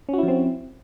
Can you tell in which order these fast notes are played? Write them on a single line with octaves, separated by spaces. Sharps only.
C#4 F#4 E4 F3 C4